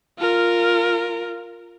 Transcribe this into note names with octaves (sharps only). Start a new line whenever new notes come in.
F4 A#4